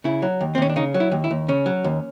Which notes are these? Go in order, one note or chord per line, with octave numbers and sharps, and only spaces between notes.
C#3 E4
F#3
D#2
C4
D#2 C#4
D4
C#3 D#4
F#3
E4
D#2
E4
D#2
C#3 C#4
F#3
D#2